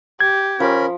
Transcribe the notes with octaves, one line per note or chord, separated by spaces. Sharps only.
G4 G#6
F3 C#4 A#4 B5